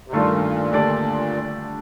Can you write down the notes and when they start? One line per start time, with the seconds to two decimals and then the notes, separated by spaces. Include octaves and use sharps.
0.08 C3
0.13 G2 A#2 D#3 A3 D4 F4
0.73 D3 A3 D4 G4 D5